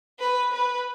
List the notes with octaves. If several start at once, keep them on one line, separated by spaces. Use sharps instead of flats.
B4
B4